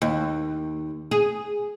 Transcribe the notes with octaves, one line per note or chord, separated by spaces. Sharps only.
D#2
G#4